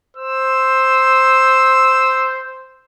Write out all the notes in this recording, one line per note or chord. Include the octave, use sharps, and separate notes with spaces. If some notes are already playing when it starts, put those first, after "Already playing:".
C5 E6